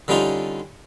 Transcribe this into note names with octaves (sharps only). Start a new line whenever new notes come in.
D3 G3 C#4 D#4 F4